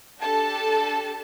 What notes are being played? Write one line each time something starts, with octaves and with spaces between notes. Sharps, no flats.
D4 G4 A4 A5